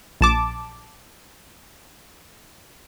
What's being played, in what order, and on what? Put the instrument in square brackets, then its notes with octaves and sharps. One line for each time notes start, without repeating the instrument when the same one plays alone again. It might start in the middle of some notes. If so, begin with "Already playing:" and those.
[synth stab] A#1 A5 D6